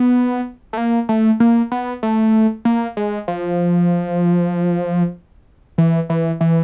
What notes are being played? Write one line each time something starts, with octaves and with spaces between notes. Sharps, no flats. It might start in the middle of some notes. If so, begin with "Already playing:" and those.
Already playing: B3
A3
A#3
A3
A#3
B3
A3
A#3
G#3
F3
E3
E3
E3